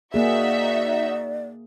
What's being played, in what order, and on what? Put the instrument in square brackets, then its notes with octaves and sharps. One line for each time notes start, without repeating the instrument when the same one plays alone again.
[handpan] A#3 G#4 [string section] D#4 F#4 E5 [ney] D5